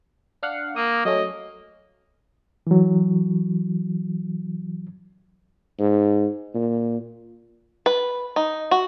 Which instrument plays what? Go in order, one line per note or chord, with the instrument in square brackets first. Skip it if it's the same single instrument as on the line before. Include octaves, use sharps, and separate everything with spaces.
[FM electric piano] D4 F5 F#5
[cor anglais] A#3 [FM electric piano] D#6
[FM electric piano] F#3 A3 C#4 [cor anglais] D#5
[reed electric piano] E3 F#3
[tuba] G#2
A#2
[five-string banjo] B4
D#4
F#4